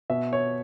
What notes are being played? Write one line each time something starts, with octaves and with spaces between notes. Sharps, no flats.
B2 E5
C#5